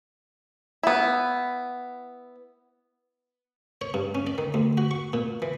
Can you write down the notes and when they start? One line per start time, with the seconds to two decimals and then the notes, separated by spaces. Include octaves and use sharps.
0.83 B3 E4
3.81 C#5
3.94 G2
4.15 C#4
4.27 D5
4.38 D#3
4.54 D2
4.78 F#4
4.91 C#6
5.13 A#2
5.42 E3